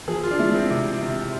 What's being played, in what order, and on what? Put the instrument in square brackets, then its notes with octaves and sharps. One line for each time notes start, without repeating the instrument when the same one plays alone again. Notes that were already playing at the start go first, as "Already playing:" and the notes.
[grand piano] F3 G#4
F4
D4
G#3 E4
C4
C3
C3